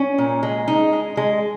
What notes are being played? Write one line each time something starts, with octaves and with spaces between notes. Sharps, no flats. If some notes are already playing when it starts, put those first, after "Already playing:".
Already playing: C#4
A#2
G#3
D#4
G#3
G#3